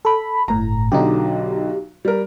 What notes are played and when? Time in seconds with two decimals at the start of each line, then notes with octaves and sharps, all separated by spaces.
0.05 A4 B5
0.48 G1 A2 A#5
0.92 B1 D3 F#3 D#4 G4
2.05 G3 A#4